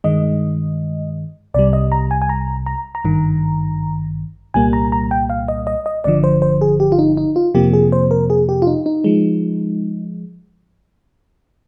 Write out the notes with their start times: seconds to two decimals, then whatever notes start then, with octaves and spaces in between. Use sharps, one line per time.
0.04 G2 D#3 G#3 D#5
1.54 C2 C3 G3 D5
1.73 D#5
1.92 A#5
2.11 G#5
2.22 G#5
2.29 A#5
2.66 A#5
2.95 A#5
3.05 G#1 G2 D#3
4.54 C2 A#2 G3 A#3 G#5
4.73 A#5
4.92 A#5
5.11 G5
5.30 F5
5.48 D#5
5.67 D#5
5.86 D#5
6.04 G1 G2 D3 F3 D5
6.24 C5
6.42 C5
6.61 G#4
6.80 G4
6.92 F4
6.99 D#4
7.17 D#4
7.36 F4
7.55 F2 C3 F3 A#3 G4
7.73 G#4
7.92 C5
8.11 A#4
8.30 G#4
8.49 G4
8.62 F4
8.67 D#4
8.86 D#4
9.04 F3 G#3